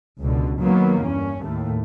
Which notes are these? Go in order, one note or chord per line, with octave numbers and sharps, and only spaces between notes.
C#2 B2 D3
D#3 F#3 A#3 B3
E2 G2 C#4
D#2 A2 A3